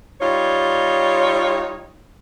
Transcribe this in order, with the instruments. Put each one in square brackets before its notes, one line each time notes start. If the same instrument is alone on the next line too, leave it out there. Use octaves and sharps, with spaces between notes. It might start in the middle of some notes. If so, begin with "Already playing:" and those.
[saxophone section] G3 D#4 F4 C#5